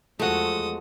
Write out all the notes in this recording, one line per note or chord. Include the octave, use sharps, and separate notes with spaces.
E2 F3 G#3 A3 F#4 A4 F#5 D#6